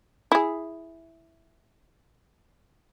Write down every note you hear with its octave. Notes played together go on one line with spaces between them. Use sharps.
E4 G#4